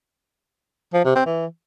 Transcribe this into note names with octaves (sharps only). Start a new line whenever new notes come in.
F3
C3
C4
E3